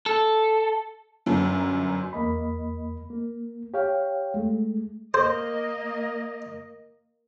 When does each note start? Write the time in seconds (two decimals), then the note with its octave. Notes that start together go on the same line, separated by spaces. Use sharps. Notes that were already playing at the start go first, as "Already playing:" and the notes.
0.06 A4
1.26 G1 F#2
2.13 E2 A#3 D#5 B5
3.10 A#3
3.74 G4 C#5 F5 G5
4.34 G#3 A3
5.14 A#3 C5 D#5